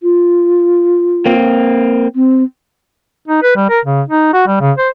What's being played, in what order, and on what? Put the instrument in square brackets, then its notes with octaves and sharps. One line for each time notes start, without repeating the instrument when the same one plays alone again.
[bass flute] F4
[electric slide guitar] A#3 C4
[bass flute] C4
[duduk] D#4
B4
G3
A#4
C#3
D#4
F#4
G3
C#3
C5